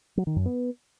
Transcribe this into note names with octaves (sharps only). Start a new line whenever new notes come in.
F#3
D#3
F#2
B3